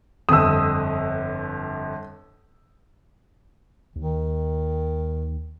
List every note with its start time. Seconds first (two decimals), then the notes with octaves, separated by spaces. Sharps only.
0.29 G1 F2 D#6 E6
3.96 D#2 D#3